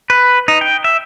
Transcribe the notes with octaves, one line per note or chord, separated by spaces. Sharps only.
B4
D#4
G5
E5